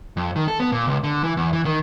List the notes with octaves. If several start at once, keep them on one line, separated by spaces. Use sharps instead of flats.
F2
D#3
A4
B3
A#2
C#2
D3
E3
E2
E3
D#3